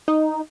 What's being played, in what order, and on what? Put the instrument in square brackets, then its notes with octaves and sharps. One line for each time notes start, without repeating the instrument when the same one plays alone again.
[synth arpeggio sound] D#4